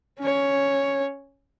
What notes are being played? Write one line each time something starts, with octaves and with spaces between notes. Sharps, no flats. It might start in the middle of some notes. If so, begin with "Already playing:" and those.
C#4 C#5